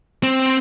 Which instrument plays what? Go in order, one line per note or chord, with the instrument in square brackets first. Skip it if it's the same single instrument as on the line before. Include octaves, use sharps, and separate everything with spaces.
[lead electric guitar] C4